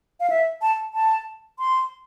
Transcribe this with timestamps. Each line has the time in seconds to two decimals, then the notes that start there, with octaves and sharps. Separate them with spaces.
0.20 F5
0.30 E5
0.62 A5
0.94 A5
1.59 C6